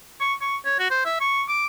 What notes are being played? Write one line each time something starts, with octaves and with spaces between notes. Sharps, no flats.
C#6
C#6
C#5
F#4
C5
E5
C#6
D6